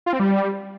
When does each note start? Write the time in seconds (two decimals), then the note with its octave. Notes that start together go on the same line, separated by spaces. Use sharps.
0.06 F4
0.13 C4
0.20 G3